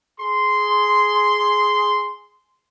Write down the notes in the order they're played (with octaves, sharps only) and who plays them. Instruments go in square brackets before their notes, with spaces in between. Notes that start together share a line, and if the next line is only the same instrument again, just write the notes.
[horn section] G#4 C6